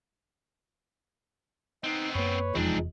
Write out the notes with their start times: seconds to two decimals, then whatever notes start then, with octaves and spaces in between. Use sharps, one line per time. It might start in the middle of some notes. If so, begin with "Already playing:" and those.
1.84 B3 C4 D#4
2.15 F#2 A#3 B4 C#5
2.55 F1 E2 F3 G#3 C4 D4 D#4